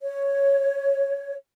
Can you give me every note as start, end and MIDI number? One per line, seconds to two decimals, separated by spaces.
0.01 1.34 73